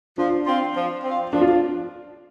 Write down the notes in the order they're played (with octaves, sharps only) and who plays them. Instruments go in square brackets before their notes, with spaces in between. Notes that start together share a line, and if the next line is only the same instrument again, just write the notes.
[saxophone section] F3 [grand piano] D4
[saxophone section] C4 F4
F3
C4 F4
[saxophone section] F3 [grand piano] D4
[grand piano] F4